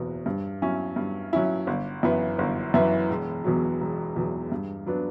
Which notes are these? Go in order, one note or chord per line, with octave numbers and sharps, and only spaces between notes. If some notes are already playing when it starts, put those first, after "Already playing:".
Already playing: F#1 E2 B2
G2
F#3 C#4 E4
G2
F#3 C#4 E4
G1
F#2 E3 B3 E4
G1
F#2 E3 B3 E4
E1
E2 B2 F#3
E1
E2 B2 F#3
G2
F#3 B3 D4